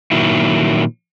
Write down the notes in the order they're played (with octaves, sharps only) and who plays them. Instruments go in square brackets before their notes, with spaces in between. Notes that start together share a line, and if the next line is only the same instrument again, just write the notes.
[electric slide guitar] A#2 D#3 F#3 E4